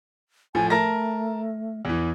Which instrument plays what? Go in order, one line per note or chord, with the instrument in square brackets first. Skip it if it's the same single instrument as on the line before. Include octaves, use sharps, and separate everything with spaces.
[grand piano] A2 F3 [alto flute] G#5
[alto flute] A3 [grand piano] A#4 A5 A#6
[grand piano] E2 E3